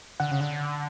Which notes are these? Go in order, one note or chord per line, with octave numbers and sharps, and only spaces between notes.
D3 F#5
C#3
D3